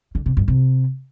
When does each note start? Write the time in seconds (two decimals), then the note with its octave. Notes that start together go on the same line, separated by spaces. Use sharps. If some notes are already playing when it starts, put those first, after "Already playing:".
0.15 D3
0.26 C3
0.37 G2
0.48 C3